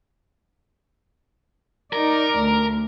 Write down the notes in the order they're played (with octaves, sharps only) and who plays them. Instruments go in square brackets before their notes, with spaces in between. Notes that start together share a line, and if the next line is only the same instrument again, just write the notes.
[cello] D#4 D5 [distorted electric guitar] A#4
[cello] D2